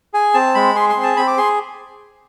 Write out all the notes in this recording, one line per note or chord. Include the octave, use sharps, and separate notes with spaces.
G#4 G#5
C4 A5
G#3 B5
G#4 C6
C6
C4
A5
C4 B5
D6
G#4 C6